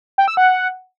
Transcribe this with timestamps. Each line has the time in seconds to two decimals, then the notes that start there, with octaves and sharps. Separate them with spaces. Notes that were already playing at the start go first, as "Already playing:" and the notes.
0.18 G5
0.28 E6
0.37 F#5